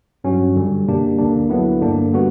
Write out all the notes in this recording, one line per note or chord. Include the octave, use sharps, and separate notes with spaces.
G2 F#3 C#4 F#4
F#2 D3 G3
B2 A#3 D4 G4
D2 D3 A#3 D4
D2 D3 F#3 B3 E4
G2 D3 A#3 D4
D3 G3 B3 F#4